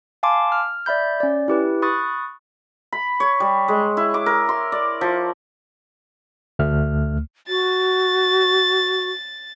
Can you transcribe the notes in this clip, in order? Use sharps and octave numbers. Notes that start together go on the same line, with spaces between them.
F5 G#5 A5 C6 D6
F6
D5 E5 B5 G6
C#4 D5
E4 G4 B4
B5 C#6 D#6 F#6 A6
B5
C#5
G3
G#3
E4
D6
A#4
C6
D5
F3
D2 A3 F6
F#4 A6